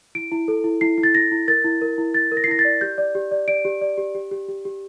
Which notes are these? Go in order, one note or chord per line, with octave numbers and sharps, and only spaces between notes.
E4 D7
E4
A4
E4
E4 C7
E4
A6
E4 A#6
E4
A#4 A6
E4
A#4
E4
E4 A6
A#4
A#6
C7
E4 A#6
A6
D5
G4 G6
D5
G4
D5
D5 D7
G4
D5
G4
G4
G4
G4
G4